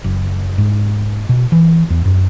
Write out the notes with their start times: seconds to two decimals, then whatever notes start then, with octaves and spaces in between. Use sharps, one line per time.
0.04 F#1
0.58 G#2
1.29 B2
1.52 E3
1.90 E2
2.05 F#2